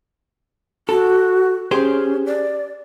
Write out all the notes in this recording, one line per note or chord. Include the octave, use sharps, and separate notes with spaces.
F#4 A4
C#4 G4 G#4 C5
D5